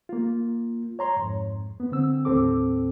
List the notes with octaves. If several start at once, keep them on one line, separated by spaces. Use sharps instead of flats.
A#3 F4
C#5 A#5 C6
F2 G#2
B3
D3 C4 E6
D#2 A2 C4 A4 D6